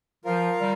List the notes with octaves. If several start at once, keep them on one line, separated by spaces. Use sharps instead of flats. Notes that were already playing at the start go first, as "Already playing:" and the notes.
F3 F4 A#4 F5
D#3 G3